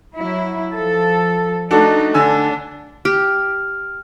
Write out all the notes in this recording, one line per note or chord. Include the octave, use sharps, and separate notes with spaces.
F#3 E4
F3 A4
A3 D4 D#4 F#4 A4
D3 D4 G#5 E6
G4 F6